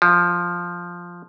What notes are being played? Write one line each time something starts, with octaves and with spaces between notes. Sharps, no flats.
F3